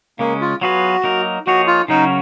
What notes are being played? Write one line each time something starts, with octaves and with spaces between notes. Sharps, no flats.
C#3 G#3 A#3 C#4
F4
F#3 B3 F4 F#4 G#4 B4
F#3 A#3 D#4 A#4
F3 A#3 D#4 F#4 G#4 C#5
F4
C#3 F#3 C#4 D#4 F#4 A#4